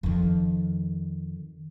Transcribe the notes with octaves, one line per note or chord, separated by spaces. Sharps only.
F2 D#3